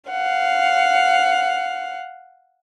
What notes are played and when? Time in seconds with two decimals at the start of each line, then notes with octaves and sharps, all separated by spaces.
0.11 F5 F#5